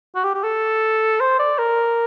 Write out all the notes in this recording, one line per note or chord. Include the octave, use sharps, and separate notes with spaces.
F#4
G4
G4
A4
C5
D5
A#4